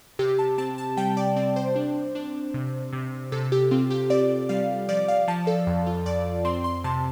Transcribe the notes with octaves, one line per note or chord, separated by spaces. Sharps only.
C3 G4
A5
C4 A5
A5
G3 G5
D5
C4 D5
C5
D4
D4
C3
C3
C3 A4
G4
C4 F4
G4
C4 D5
G3 F5
F3 D5
F5
F3 A5
A4
F2
F4
F2 D5
C4 C6
C6
C3 A5